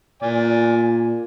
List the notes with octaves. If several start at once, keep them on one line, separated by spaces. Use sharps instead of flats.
A#2 D5 G#5